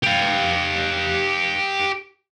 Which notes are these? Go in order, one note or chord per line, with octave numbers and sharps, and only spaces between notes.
G4 F5